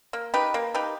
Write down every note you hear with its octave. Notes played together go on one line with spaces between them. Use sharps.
A#3
D#4 G4 B4
A#3
D#4 G4 B4